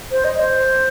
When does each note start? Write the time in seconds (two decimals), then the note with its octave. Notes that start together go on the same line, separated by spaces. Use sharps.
0.11 C5
0.25 D#5
0.39 C5